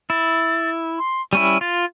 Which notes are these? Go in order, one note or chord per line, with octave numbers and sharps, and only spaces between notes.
E4 A6
C6
G3 C#4 E4 D#7
F4 A6